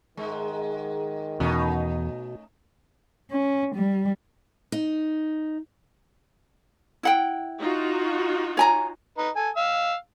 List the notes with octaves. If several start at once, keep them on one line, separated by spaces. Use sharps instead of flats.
G#2 D#3 G#3
E2 B2 A3 C#4 D#4
C#4
G3
D#4
E4 F#5 G5
D#4 F4 F#4
C#5 G#5 A#5
D#4 B4
A4 G#5
F5 E6